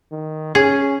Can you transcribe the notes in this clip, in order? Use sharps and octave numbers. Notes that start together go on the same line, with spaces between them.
D#3
C#4 G#4